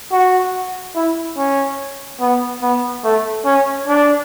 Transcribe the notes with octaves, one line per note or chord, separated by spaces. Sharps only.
F#4
E4
C#4
B3
B3
A3
C#4
D4